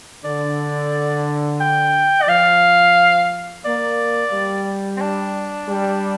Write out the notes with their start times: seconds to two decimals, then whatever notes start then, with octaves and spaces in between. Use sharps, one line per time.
0.25 D3 D5
1.60 G5
2.22 D5
2.28 F3 F5
3.65 A#3 D5
4.32 G3
4.97 C4
5.01 D4
5.69 G3